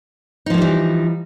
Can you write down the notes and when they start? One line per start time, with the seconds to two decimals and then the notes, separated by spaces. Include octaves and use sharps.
0.46 D#4
0.50 F3
0.54 A#3
0.58 G3
0.62 E3